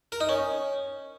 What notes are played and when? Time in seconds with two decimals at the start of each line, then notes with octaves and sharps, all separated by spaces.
0.12 A#4
0.21 D#4
0.29 C#4